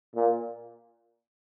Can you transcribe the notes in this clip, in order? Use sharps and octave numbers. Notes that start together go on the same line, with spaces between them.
A#2